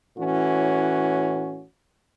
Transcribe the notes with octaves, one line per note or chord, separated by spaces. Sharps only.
A2 E3 C#4 F#4